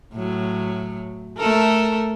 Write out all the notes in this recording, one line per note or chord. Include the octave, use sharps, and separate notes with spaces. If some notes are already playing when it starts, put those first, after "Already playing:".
A2 F#3
A3 A4 A#4